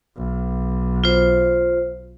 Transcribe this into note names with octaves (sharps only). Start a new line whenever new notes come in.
B1
F4 C5